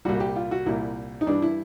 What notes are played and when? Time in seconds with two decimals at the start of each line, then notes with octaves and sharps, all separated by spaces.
0.05 C2 A#2 G3 F#4
0.20 G4
0.36 F4
0.51 F#4
0.66 C2 A#2 G3 E4
1.21 D#4
1.26 G2 E3 G3 D4
1.42 E4